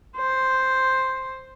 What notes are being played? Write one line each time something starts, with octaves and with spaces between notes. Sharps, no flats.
C5